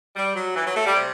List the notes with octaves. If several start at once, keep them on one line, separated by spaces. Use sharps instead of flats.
G3
F#3
E3
F#3
A3
G3
C3